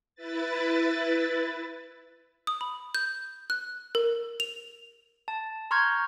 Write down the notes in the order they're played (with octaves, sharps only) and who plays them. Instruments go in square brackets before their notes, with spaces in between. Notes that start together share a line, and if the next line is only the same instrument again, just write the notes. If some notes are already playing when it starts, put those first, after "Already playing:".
[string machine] E4 B4 A6
[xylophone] D#6
B5
G6
F#6
A#4
F7
[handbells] A5
A#5 C6 C#6 F6 G6 G#6